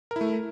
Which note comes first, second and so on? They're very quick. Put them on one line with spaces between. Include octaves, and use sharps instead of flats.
A#4 E4 A3